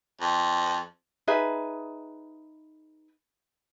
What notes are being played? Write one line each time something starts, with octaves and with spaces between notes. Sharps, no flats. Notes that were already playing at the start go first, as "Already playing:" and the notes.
F2
D#4 G#4 B4 E5